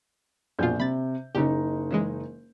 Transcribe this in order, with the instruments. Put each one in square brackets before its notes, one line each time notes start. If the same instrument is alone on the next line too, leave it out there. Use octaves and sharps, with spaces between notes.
[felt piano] A#1 G6 [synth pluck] F2 B2 F4
[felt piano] C3 [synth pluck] B5 A6
[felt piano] F#1 D#4 [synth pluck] C#3 G4
[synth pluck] C#3 E3 G#3